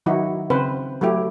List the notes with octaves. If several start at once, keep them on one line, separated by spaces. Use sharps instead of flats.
D#3 F#3 D#4 E4 F#4
C#3 C4 B4 C5
F#3 A3 E4 G4